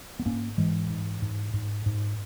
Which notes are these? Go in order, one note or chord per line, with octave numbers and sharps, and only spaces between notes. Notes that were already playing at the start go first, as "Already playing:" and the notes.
B3
G#2 A#3 C#4
G#2 E3 G#3
G#2
G#2
G#2
G#2